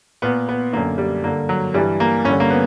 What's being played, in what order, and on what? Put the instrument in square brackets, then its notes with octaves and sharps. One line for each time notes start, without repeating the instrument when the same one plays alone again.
[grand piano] A#2 B3
B3
D3 A#3
F#2
G3
G2 D3 A#3
F#3
G2 E3 G3
A#3
G2 C#4
D3
A#3
B3